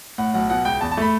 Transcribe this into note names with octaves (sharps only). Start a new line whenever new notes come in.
A2 F#5
B1 F#5
B2 F#5
C#2 G5
E2 A5
A5
A3 B5